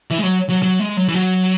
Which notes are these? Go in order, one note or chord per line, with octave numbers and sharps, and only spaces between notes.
E3
G#3
F#3
F#3
F#3
G#3
F#3
E3
F#3